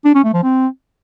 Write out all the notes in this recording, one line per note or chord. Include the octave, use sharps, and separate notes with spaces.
D4
C#4
A3
F3
C4